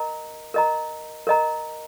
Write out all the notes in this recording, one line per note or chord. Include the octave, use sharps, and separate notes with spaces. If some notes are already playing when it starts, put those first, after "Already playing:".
Already playing: A#4 D#5 A#5
A#4 D#5 A#5
A#4 D#5 A#5